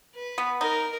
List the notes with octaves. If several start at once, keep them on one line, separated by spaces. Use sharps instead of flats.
B4
B3
D#4 A#4